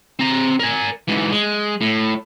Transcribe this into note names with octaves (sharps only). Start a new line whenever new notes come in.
C4 A#5
A#4 G#5
G#2 E3
G#3
A2